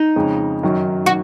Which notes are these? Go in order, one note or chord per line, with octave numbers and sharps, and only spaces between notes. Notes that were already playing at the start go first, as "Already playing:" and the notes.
Already playing: D#4
F2 C#3 G#3
F#2 D#3 F#3
F#4